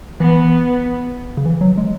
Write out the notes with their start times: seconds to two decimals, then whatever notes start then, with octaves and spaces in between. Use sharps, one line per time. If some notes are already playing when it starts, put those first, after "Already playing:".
0.20 E3 B3
1.37 C#3
1.46 E3
1.61 F#3
1.78 G#3